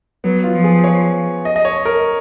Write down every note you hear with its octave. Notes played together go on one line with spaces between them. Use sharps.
F#3 B3
F4
F3
G#4
C#5
D#5
D#5
C#5
A#4